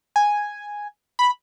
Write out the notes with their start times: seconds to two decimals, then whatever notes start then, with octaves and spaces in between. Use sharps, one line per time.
0.16 G#5
1.19 B5